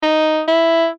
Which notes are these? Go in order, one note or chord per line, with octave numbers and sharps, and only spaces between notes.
D#4
E4